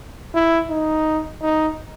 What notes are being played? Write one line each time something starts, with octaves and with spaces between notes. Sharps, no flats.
E4
D#4
D#4